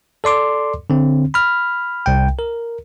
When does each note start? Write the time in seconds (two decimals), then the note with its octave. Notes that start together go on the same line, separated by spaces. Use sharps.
0.24 A4 D5 C6 D6
0.90 D3 C4
1.34 B5 F6
2.06 C2 G5
2.39 A#4